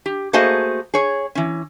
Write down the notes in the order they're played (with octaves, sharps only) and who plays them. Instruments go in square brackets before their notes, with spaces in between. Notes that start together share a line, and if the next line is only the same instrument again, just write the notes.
[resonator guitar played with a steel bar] G4
A3 A#3 F#4 G#4 C5 D#5
G#4 C#5
E3 C#4